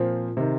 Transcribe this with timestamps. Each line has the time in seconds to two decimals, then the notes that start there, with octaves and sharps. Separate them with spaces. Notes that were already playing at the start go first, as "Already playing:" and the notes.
Already playing: A#2 F3 C4
0.37 C3 D#3 C4